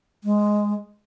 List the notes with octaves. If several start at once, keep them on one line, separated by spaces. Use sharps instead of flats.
G#3